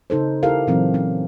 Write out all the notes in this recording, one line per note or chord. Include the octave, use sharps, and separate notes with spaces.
C#3 D#4 A4 C5
E4 G4 A4 A#4 F5
A#2 E3 F#3 C4
C#4